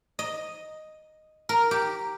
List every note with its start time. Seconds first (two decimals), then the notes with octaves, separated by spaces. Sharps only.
0.19 D#5
1.49 A#4
1.71 G4